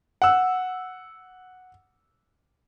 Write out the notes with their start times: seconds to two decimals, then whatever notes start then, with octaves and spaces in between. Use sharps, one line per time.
0.22 F#5 E6